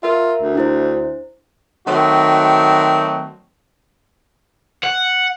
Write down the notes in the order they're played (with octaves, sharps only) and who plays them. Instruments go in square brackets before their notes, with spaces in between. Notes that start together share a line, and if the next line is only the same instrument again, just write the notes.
[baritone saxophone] F4 [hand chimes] A#4 E5
[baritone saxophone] D2
[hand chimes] D4 E4 C5
[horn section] D#3 F#3 A3 C4 F#4
[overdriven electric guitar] F#5